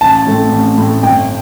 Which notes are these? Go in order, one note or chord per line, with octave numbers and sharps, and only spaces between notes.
A1 A5
A2 A3 C4
A1
A2 A3 C4
G1 G5